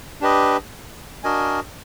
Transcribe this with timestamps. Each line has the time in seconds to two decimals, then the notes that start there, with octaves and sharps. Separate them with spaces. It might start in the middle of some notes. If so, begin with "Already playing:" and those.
0.21 D4 G4 B4 D#5
1.24 D4 F#4 A#4 D#5 G#5